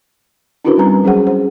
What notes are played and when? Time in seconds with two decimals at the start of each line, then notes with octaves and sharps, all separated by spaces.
0.65 C#4 D4 E4 F#4 A#4 B4
0.78 G3 C4 A#5
1.04 F#3 C#4 G#4 C5 F#5
1.27 C5